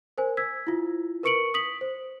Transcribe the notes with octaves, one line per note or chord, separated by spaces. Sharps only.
A#4 C5 G#5
E6 G#6 B6
E4 F4
A#4 B4 C#6 C#7 D7 F#7
D#6 B6 F#7
C5